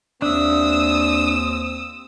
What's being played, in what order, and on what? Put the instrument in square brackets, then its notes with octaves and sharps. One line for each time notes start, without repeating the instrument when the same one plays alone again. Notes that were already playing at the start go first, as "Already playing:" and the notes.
[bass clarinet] D#2 [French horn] C4 [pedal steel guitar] D4 E5 [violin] D#6 E6